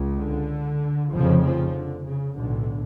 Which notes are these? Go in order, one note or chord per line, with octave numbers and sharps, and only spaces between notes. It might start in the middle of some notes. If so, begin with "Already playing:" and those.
Already playing: C#2 C#3
D3
F1 F2 C#3 F3
F3
D3
C#3
B1 A2 D3